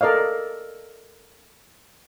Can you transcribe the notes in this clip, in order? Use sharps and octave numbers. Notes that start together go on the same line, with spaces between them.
A4 A#4 D5 D#5 F5